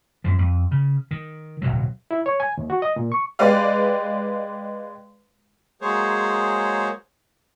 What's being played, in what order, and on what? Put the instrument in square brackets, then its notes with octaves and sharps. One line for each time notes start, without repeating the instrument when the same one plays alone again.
[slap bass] F#2 F3
F2
C#3
D#3
D1 B1 B2 F#3
[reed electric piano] E4
C#5
G#5
D#2
F#4
D#5
A#2
C#6
[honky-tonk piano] G#3 G4 B4 D5 F5
[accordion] F#3 G#3 A#3 G#4 C5 C#5